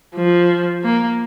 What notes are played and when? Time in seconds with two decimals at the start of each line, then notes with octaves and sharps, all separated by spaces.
0.15 F3
0.84 A#3